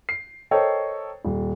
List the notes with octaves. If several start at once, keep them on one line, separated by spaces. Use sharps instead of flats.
C7
A4 A#4 C5 C#5 D#5 G5
D#1